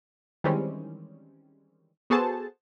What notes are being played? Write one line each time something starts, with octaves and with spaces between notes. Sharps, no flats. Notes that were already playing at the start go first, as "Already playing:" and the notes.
D#3 E3 G3 G#3 C4 C#4
B3 F#4 G#4 A4 C5 A5